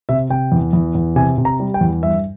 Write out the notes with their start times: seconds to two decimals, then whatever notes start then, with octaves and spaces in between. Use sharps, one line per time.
0.09 C3 E5
0.30 C3 G5
0.52 E2
0.73 E2
0.95 E2
1.16 C3 G#5
1.38 C3
1.45 A#5
1.60 G3
1.74 G5
1.81 E2
2.02 G2 E5